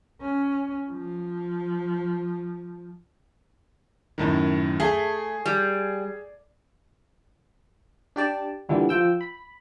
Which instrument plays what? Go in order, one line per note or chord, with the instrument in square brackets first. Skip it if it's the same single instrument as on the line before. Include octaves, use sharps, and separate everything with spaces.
[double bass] C#4
F3
[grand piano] F#2 A2 D#3
[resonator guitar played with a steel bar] A3 [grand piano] G#4
[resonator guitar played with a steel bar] G3
[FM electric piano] D4 G4 D5 A5
A#2 D3 E3 G3 B3
F3 G5 E6
B5